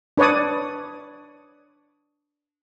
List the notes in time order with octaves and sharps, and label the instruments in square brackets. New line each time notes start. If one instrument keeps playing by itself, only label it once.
[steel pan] D4 B4 C#5 D5 D#6